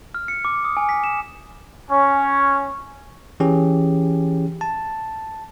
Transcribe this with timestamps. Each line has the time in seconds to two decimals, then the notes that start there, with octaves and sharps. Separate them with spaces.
0.15 F6
0.28 C#7
0.45 D6
0.65 D#6
0.77 G#5
0.89 B6
1.04 E7
1.91 C#4
3.40 E3 C#4 G4 G#4
4.61 A5